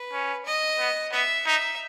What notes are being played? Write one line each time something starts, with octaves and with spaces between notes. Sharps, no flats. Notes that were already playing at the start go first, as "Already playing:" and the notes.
Already playing: B4
C#4
D#5
B3
B3 E5
D#4 E5